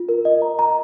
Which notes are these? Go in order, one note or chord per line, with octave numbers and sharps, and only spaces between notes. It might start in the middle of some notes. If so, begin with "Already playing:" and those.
Already playing: F4
A#4
D#5
A#5
A#5